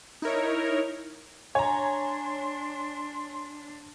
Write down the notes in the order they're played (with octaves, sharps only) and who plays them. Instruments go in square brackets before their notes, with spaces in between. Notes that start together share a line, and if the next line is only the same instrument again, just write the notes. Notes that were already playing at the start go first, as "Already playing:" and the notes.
[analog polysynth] D#4 E4 A#4 C#5
[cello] D4 [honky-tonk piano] C#5 A#5 [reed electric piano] G#5 [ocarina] C6